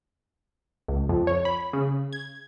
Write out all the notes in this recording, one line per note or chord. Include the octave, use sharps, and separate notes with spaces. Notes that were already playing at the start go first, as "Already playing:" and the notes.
C#2
F2
C#5
B5
C#3
G#6